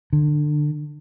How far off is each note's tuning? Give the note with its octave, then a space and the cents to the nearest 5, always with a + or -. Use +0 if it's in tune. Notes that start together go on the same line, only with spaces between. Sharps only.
D3 +25